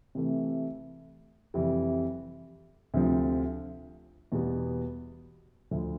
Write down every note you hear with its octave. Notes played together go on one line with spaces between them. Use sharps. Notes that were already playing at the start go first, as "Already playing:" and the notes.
C3 E3 A3
F2 C3 E3 G3
D2 C3 F3
E2 B2 G3 B3
D2 D3 F3